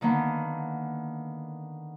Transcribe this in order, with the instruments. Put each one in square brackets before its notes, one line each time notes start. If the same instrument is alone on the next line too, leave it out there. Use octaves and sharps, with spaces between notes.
[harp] D3 D#3 A#3 B3